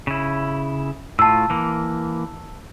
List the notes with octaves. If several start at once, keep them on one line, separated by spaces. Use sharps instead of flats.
C#3 E4
A2 F4 A5 E6
E3 A#3